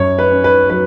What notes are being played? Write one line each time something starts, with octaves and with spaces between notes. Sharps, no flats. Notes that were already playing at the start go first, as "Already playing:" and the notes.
Already playing: F#2 C#5
B4
C#4
B4
F#3 B4